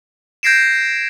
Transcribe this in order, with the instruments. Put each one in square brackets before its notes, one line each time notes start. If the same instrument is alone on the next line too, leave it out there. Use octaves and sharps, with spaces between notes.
[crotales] G6 G#6 A#6 C7 D7 E7